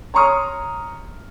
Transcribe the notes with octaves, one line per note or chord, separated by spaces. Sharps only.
C#5 A#5 C6 C#6 D#6 F6